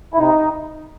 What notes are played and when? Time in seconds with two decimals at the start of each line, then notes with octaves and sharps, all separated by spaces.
0.14 E4
0.18 C3 D#4